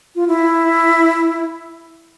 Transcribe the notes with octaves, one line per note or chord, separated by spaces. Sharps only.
F4
E4